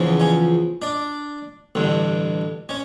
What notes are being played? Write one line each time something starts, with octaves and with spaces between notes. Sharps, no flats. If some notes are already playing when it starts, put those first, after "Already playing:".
Already playing: E2 C#3 F3
C#4 C#5
D4 D5
A1 G2 D3
C#4 C#5